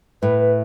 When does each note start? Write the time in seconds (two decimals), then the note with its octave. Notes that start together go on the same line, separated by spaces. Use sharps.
0.22 A2 B4
0.40 B4